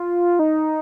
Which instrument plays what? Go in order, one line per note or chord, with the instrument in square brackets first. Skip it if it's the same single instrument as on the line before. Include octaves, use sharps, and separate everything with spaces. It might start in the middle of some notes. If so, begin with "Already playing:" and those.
Already playing: [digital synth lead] F4
D#4